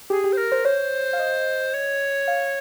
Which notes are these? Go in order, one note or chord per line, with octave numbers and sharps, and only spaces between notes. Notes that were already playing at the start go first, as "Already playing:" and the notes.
G4 G#4
G4
C5
A#4
C5
C5 C#5
F5
D#5
C#5
F5